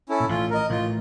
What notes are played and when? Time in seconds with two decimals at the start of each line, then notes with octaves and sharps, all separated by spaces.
0.09 C#4 E4 A4
0.20 A#2
0.29 A1 A2 F4
0.50 A#4 D#5
0.70 A1 A2 F4